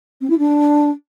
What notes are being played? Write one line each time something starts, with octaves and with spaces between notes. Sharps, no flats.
C4
E4
D4